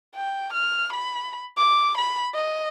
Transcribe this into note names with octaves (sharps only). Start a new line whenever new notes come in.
G5
F6
B5
D6
B5
D#5